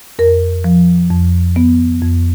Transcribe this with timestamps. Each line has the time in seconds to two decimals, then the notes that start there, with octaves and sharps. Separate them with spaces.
0.19 F2 A#4
0.64 F3
1.10 F2
1.56 B3
2.02 F2